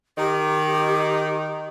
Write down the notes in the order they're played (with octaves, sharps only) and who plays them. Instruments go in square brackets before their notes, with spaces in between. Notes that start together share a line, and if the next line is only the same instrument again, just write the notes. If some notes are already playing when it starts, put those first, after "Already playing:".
[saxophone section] D#3 [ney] G4